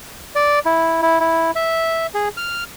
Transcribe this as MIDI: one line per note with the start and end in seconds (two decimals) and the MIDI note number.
0.35 0.59 74
0.65 1.01 64
1.02 1.19 64
1.20 1.51 64
1.56 2.07 76
2.14 2.29 68
2.37 2.64 89